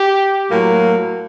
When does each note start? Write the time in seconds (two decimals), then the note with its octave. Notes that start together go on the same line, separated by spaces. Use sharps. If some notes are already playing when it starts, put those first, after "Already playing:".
Already playing: G4
0.51 A2 F#3 A#3